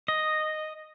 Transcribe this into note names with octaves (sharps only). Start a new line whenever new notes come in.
D#5